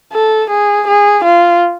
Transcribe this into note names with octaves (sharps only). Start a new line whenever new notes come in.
A4
G#4
G#4
F4